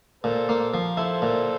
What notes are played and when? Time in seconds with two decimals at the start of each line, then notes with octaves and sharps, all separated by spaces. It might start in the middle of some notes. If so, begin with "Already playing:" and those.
0.24 A#2 A4 C5
0.49 A#3
0.74 F3
0.97 E4 A4 C5
1.22 A#2